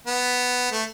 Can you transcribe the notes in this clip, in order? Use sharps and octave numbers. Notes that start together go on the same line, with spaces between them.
B3
A3